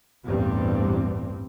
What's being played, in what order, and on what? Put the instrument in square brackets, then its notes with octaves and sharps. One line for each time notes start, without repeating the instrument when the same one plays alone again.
[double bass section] A1 E2 G2 G3 C4